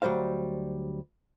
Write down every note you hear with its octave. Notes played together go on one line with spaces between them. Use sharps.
D2 F#3 G3 C5 F5